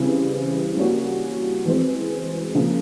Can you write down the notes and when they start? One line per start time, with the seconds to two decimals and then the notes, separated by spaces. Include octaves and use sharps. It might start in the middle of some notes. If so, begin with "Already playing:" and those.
Already playing: C#3 E3 G3 C4 E4
0.77 G3 A#3 C#4 F#4
1.65 E3 G#3 C4
2.55 C#3 F3 A#3